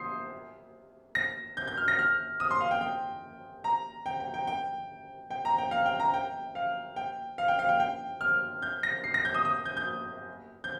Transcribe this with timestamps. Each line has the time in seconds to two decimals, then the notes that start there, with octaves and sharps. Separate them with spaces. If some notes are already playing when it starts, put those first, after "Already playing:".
Already playing: C6 D#6 G6 C7
1.15 A#6
1.57 G6
1.68 G6
1.77 F6
1.88 A#6
1.99 F6
2.40 D#6
2.51 C6
2.61 F5
2.71 G5
2.81 G5
3.64 A#5
4.06 G5
4.20 G5
4.34 G5
4.47 G5
5.30 G5
5.45 A#5
5.58 G5
5.71 F5
5.86 G5
6.00 A#5
6.14 G5
6.55 F5
6.96 G5
7.38 F5
7.48 G5
7.59 F5
7.69 G5
7.80 G5
8.21 F6
8.62 G6
8.83 A#6
9.04 C7
9.14 A#6
9.25 G6
9.34 D#6
9.45 D#6
9.65 G6
9.77 G6
10.64 G6